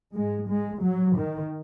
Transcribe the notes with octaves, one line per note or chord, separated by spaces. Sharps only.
G#2 G#3
G#3
F#3
D#3